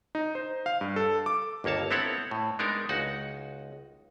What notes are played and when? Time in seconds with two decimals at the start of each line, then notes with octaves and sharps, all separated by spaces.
0.15 D#4
0.35 C5
0.66 F5
0.81 G2
0.96 A4
1.26 D6
1.64 G1 D#2 A#3 C#5 A5
1.91 B3 C4 E4 A4 C#5 F#5
2.31 A2
2.59 G#3 B3 D4 D#4 A#4
2.89 C#2 D#4 F#4 F#5